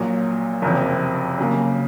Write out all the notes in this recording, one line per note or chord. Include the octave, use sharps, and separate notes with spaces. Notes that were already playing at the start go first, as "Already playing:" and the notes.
Already playing: A#1 A#2 F#3
F#1 F2 C3 F3
C#3 F#3 A#3